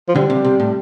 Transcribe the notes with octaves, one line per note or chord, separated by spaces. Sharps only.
F3
D3 G3
C3
C3
A2